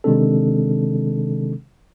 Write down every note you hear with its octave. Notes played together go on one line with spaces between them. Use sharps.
C3 D#3 G#3 C4 D4 A4